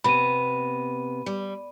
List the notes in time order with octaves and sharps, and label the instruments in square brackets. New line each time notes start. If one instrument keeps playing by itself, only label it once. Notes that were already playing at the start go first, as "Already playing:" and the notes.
[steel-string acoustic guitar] C3 B3 [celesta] B5 D#7
[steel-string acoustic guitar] G3